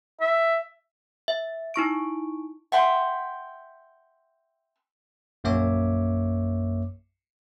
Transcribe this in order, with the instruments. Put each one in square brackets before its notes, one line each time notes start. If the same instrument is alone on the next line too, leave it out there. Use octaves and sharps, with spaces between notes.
[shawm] E5
[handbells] E5
D#4 E4 C#6 D7
[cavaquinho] E5 F#5 G5 C6
[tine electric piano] A#1 F#2 A#3 C#5 E5 D6